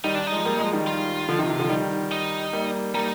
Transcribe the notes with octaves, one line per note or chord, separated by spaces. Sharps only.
D#3 G3 D#4
D4
D#4
F3 G#3
G3 A#3
F3 G#3
D#3 G3
F4
D3 F3
C3 D#3
C3 D#3
D3 F3
D#3 G3
D#4
G3 A#3
G3 A#3 D#4